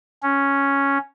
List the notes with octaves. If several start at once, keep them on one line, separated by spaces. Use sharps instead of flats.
C#4